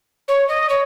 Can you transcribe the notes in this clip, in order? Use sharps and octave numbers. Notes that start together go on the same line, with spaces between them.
C#5
D#5
C#5